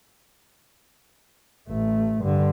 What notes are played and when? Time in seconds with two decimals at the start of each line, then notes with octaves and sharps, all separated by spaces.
1.69 A1 A3
2.22 G2 D3